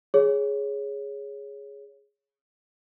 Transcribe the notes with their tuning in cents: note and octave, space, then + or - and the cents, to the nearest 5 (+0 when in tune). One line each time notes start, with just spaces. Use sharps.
G#4 +0 C#5 +0